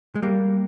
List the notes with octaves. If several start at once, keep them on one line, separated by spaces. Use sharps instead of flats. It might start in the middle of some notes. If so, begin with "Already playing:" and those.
G#3
G3 A#3